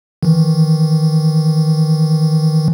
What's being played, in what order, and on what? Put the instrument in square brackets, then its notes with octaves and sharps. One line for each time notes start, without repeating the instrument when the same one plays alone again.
[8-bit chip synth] D#3 E3